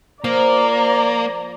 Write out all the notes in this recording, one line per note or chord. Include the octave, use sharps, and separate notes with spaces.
F3 A#3 D5 A#5